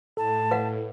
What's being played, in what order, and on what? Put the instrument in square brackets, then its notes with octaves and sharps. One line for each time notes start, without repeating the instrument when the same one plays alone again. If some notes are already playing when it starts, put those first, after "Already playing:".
[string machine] A2 [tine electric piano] A4 [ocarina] A5
[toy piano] B4 F5 F#5